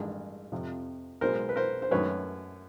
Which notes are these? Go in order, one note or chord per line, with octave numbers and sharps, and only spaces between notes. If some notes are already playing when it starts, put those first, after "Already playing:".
Already playing: A1 G2 D#3 G#3
F2 C3 F3
B1 B2 G#3 A#4 C5
B4
A#4 C5
C5
F#2 D#3 F#3 A3 B4 C#5